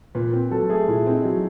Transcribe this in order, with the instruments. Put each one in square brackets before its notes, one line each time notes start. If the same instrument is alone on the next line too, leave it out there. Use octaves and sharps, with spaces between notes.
[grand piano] A#2 [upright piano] B4
[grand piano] C4
[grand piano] F#3 [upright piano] A4
[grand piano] A3 [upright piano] G#4
[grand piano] A#2 [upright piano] E4
[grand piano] C4
[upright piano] D#4
[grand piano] F#3